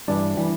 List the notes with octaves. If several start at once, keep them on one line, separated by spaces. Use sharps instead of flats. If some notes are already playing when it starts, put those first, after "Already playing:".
G2 E3 G3 D4 D5
E3 G3